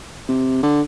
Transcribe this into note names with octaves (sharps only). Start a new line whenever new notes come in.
C3
D3